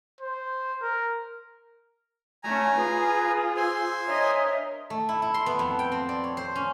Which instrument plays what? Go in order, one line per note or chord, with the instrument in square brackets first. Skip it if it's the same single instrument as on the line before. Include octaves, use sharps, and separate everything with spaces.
[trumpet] C5
A#4
[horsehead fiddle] A3 C#4 [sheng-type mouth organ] G#5 A#5
[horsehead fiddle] F4 G#4 [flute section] B4
[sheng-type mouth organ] C5 G#5 C6 [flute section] F5 E6
[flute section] D4 C#5 E5 [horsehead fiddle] A#4 D#5
[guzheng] A3
E4
E4
C6
B3
F2
G5
C4
D5
C#5
C5
C#4